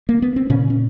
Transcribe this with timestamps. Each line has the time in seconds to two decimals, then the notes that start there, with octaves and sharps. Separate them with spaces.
0.09 A#3
0.22 B3
0.36 C4
0.50 A#2 C#3 C#4
0.70 C#4